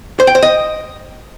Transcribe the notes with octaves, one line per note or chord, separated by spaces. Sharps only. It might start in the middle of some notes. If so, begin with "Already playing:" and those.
C5
G5
C5
D#5